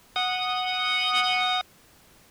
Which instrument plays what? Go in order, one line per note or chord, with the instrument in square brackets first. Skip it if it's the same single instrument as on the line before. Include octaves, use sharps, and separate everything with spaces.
[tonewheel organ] F#5 D#6